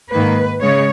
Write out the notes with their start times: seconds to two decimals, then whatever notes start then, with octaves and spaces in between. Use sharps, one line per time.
0.12 G#2 D#3 A#3 B4
0.62 C#3 G#3 C#5